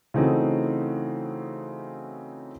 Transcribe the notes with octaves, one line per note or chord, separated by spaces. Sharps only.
C#3 E3 A3 C4 D#4 F#4